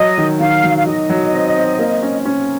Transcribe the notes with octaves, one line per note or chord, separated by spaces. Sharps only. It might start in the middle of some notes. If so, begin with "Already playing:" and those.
Already playing: F#3 D#5
D#3
D#3 F5
F#3
F5
D#3 D#5
F#3
C4
C4
A#3
C#4
C#4